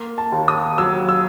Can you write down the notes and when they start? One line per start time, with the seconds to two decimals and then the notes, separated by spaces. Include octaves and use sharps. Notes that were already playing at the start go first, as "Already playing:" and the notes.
Already playing: A#3
0.18 A5
0.32 D#2
0.48 D#6
0.78 F#3 E6
1.09 E6